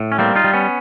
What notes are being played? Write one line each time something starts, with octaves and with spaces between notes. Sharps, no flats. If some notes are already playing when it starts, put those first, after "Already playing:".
Already playing: A2
C#4
G3 A#3 C4
D#4 F4
G3
B3 C#4